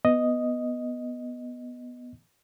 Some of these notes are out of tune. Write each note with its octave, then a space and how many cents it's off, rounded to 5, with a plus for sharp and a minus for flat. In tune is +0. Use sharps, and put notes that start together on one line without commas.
B3 +0 D#5 +0